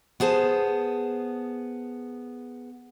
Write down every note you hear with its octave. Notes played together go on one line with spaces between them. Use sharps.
B3 G#4 C5 A5